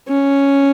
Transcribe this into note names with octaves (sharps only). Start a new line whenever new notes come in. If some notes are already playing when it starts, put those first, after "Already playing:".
C#4